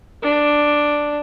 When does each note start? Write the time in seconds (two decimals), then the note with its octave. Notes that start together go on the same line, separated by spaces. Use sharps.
0.23 D4